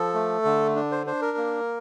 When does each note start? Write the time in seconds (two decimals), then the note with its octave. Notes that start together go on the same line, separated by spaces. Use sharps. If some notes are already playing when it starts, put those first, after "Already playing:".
Already playing: F3 A4
0.14 A3
0.45 D3
0.76 D4
0.91 C5
1.06 D4 C5
1.22 A#4
1.37 A#3